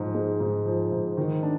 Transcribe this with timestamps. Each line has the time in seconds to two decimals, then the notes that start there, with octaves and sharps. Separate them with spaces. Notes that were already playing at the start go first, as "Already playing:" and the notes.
Already playing: G#2 F3
0.14 G#3
0.40 G#2
0.65 F3
0.92 G#2
1.17 D#3
1.43 D4